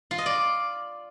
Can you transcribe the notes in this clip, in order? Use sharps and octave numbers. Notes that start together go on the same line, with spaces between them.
F4
D#5
D5